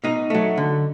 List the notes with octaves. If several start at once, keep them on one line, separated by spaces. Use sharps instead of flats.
B2 D#4
F#3 A3
D3